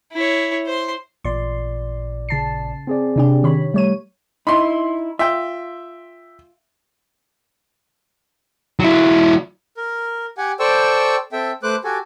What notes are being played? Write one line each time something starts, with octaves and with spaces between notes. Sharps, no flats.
E4 C#5
C5 C6
A1 A#2 D5 C6
C#3 A5 C7
C4 G#4 D5
C3 D4 G4
D#3 C#5 B5
G3 A3 C#5 D#7
D#4 E4 B5 C6
F4 E5 G5
F#3 E4
A#4
G4 F#5 G#5
A4 C5 D5 G5 C#6 E6
C4 A4 E5 G5
A3 B4 C5 D6 F#6
F#4 G4 A4 G#5